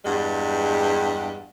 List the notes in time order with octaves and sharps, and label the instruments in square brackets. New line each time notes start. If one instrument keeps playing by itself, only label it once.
[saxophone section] E2 G2 G3 G#3 F#5